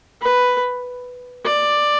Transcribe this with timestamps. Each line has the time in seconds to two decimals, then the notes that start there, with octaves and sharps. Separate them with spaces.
0.22 B4
1.45 D5